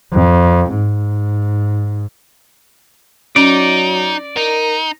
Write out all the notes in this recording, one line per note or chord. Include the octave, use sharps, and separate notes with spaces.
F2
G#2
F#3 C#4 D#4 D5
D#4 A#4